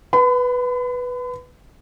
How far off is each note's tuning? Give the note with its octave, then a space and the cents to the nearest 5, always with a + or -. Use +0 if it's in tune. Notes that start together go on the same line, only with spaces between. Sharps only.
B4 +0 B5 +40